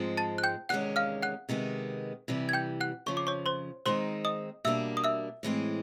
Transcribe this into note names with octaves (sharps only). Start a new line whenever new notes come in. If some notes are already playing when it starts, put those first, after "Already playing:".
Already playing: G#2 F3 G#3 C4
A5 A6
F#6
G5 G6
E2 C3 D#3 G#3 C#4 F#5 F#6
F5 F6
F#5 F#6
C3 D#3 G#3 B3
C3 E3 G3
G#6
G5 G6
F#5 F#6
F2 C#3 F3 C#6
D6
C#5 C#6
C5 C6
D#3 G#3 C4 D#4 C5 C6
D#5 D#6
B2 G3 A#3 D4 E5 E6
D#6
E5 E6
A2 E3 G#3 C4